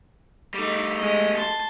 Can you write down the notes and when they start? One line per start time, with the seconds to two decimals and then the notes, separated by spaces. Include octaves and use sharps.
0.54 G3 A3 D#4 D6
0.98 G#3 D#5
1.37 A5 C6